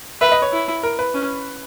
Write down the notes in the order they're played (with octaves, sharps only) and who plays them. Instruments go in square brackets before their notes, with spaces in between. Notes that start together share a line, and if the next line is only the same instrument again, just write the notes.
[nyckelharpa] B4 [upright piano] E5
[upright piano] D#5
C#5
[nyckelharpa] E4
[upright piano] A#4
B4
[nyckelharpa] C#4